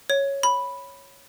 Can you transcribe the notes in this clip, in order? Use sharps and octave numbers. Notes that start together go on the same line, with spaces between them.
C#5
B5